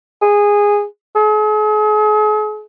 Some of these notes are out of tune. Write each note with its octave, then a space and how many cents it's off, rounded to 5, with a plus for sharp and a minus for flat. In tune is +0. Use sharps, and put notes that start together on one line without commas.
G#4 -15
G#4 +40